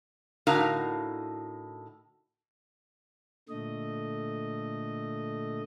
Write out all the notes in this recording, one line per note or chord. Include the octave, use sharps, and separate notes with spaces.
A2 D3 D#4 F#4 A#4 F5
A#2 D3 A3 D#5